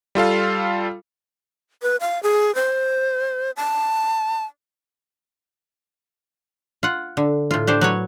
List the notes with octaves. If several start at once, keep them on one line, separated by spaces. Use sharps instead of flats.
G3 F4 A4 F5
B4
F5
G#4
C5
A5
F4 F#5
D3
A2 F4
D4 G4 C5
F#3 B4 C#5